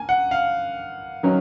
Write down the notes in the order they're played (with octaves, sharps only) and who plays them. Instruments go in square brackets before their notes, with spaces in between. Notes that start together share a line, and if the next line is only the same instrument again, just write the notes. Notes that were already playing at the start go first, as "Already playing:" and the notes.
Already playing: [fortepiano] A#3 [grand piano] G#5
[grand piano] F#5
F5
[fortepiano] D#3 F#3 C#4